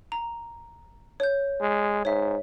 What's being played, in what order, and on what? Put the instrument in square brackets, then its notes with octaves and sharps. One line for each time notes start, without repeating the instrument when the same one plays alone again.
[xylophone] A#5
C#5 G6
[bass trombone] G#3
[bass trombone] G#2 [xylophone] C#5 E5